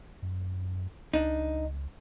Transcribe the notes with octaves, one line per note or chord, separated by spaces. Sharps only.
F#2
C#2 D4 D#4